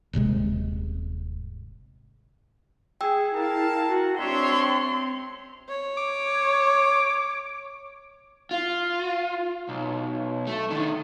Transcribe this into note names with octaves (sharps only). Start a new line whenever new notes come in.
D#1 G#1 C3 G#3
G#4 G5 E6
E4 A#4 F5 A5
F#4
C4 D4 C#5 E5 C6
C4
C#5
D6
F4
B1
A3
D3 D#3